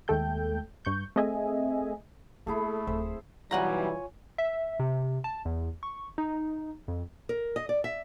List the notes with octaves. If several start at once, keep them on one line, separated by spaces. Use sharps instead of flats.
D#2 G#3 A3 A4 G5 G6
G2 C#6 G6
A3 C4 G#4 D#5 E5 G#5
A3 A#3 D4 E4 G#4 A4
D1 C4 C5 E5
B1 E3 G3 F4 C#5 F#5 G#5 A#5
E5
C3
A5
E2
C#6
D#4
F2
A#4
D#5
D5
E5